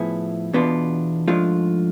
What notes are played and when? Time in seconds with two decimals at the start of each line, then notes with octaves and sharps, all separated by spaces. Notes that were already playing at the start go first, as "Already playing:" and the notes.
Already playing: A2 F3 B3 E4 G#4
0.54 E2 B2 B3 D4 F4
1.28 G#2 F3 A3 D4 F4